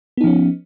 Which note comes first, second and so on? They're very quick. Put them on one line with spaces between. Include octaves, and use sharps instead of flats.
B3 D#4 F3 C#4